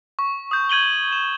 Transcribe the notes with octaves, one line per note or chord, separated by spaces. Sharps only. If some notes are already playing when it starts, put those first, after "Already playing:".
C#6
D#6 G6
G6 G#6 D#7 F#7 G7
E7